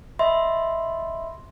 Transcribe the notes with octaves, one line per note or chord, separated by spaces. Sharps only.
D#5 E5 B5 C6